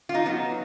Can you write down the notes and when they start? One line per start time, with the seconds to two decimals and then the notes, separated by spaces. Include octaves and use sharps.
0.09 F4
0.15 D#4
0.26 F#3 B3